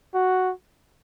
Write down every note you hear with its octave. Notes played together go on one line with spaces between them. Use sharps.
F#4